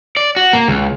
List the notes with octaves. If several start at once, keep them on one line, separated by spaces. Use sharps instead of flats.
D5
F#4
A#3
C#2